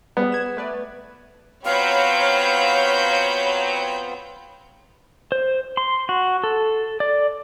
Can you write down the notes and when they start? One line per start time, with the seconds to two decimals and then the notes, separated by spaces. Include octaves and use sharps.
0.17 G3 B3 G#4
0.32 G#6 E7
0.57 A3 B4 D5
1.65 F#3 B3 C4 F4 C#5 F5 B5 G6
5.32 C5
5.77 C6
6.09 F#4
6.44 A4
7.00 D5